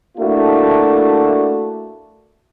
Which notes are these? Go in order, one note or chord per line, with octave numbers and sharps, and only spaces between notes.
A3 A#3 D4 E4 F#4